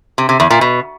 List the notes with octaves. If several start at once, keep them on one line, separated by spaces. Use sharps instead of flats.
C3
C3
E2
A#2
B2